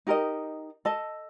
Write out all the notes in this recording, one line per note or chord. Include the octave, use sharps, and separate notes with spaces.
D#4 G4 A#4 D#5
A4 D#5 A5